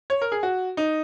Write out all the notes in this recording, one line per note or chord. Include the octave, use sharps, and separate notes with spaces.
C#5
A#4
G#4
F#4
D#4